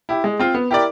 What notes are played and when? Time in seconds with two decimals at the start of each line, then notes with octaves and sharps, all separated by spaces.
0.09 E4 G4
0.24 G#3
0.39 C4 F4
0.54 B3
0.70 E4 G4 A#4 D5